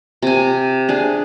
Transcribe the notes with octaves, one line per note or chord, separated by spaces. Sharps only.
C3 G#5
D4 G#4